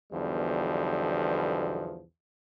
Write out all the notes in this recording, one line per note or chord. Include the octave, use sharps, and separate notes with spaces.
B1 E2 B2 D3 F3 G3